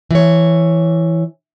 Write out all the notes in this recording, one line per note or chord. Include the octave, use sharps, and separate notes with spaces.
E3 C#5